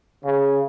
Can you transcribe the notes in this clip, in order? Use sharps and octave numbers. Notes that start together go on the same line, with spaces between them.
C#3